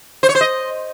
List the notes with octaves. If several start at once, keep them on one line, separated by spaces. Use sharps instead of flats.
C5
C#5
C5
D#5